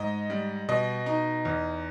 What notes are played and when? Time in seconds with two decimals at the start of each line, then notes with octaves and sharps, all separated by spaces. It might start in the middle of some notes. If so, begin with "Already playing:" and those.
Already playing: G#2 D#5
0.30 G3
0.69 B2 D#5
1.06 D#4
1.45 E2